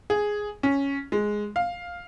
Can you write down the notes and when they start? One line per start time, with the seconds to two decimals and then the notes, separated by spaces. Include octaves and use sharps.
0.10 G#4
0.63 C#4
1.12 G#3
1.56 F5